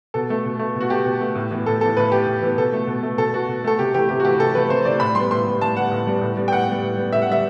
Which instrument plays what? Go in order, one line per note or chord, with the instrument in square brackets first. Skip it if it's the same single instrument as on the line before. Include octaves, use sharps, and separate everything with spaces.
[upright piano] B2 A4
A3
B2
A3
B2 F#4
A3 G4
B2
A3
A2
E3 B3
A2 A4
E3 B3 A4
A2 B4
E3 B3 G4
A2
E3 B3
B2 A4
A3
B2
A3
B2 A4
A3 F#4
B2
A3 A4
C3 G4
E3 A3 G4
C3 G4
F#4
E3 A3 G4
C3 A4
E3 A3 B4
C3 C5
E3 A3 D5
A2 B5
G3 B3 C6
A2 C6
G3 B3
A2 A5
G3 B3 F#5
A2
G3 B3
A2
G3 B3
G5
A2 F#5
G3 B3
A2
G3 B3
A2 E5
F#5
G3 B3 E5